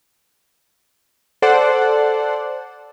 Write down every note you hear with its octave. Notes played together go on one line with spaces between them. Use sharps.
A4 C5 D5 F#5